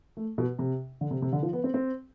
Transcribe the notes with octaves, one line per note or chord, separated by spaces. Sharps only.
A3
B2
C3
D3
C3
C3
D3
F3
B3
C4
C4